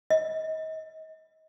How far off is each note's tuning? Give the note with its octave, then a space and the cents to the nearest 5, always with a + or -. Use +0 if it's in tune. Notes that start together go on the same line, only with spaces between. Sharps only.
D#5 +35